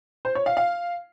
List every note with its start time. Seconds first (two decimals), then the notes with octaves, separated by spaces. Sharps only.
0.25 C5
0.35 C#5
0.46 F5
0.57 F5